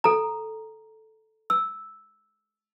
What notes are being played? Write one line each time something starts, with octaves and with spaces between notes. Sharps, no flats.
A4 A#5
E6